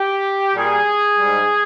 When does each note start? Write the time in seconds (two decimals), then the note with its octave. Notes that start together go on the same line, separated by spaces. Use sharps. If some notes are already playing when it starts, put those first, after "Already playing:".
Already playing: G4
0.55 A#2 G3 G#4
1.19 G#2 G3